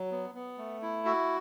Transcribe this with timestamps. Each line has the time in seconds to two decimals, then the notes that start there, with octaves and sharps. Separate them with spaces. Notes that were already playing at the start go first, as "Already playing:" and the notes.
Already playing: F#3
0.12 B3
0.35 B3
0.58 A3
0.82 E4
1.05 F#4 E5